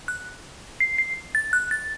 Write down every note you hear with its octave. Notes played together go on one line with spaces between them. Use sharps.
F#6
C7
C7
A6
F#6
A6